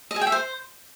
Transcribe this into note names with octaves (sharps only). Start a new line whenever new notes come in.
D#5
G#4
G5
E5
C5